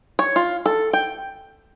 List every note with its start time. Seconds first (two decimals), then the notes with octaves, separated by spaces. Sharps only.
0.19 C#5
0.36 F4
0.66 A4
0.93 G5